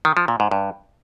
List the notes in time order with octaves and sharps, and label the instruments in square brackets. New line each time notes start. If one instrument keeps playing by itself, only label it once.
[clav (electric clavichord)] D#3
F3
A#2
G#2
G2